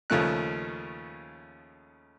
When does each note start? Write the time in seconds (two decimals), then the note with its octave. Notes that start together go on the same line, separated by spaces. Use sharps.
0.10 D#2 C#3 F3 A3 F#6